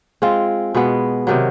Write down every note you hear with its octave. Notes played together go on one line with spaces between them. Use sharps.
G#3 C4 F4
B2 G#3 B3
C3 D#3 F#3